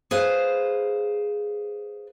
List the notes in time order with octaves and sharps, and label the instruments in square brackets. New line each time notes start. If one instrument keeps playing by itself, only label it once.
[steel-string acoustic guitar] G#4 B4 C5 F5